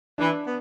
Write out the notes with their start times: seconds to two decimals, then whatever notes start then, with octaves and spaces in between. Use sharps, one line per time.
0.18 E3 D4
0.46 B3